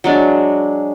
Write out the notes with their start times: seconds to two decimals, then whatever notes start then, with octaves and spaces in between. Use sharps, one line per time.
0.04 F#3 G#3 D4